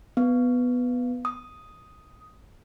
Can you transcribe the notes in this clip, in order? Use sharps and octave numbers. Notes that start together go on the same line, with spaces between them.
B3
D#6